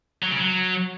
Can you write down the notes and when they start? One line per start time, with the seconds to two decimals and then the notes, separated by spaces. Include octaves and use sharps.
0.23 F#3
0.31 C#3
0.39 F#3